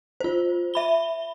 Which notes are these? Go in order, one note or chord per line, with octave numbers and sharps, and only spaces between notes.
F4 C5
E5 B5 G7